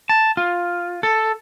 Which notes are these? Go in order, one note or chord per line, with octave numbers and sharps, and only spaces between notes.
A5
F4
A4